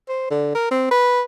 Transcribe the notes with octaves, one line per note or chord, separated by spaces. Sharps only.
C5
D3
A#4
C4
B4